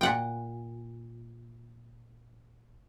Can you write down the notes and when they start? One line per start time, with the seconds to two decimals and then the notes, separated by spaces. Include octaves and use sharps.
0.01 A#2 F#5 G5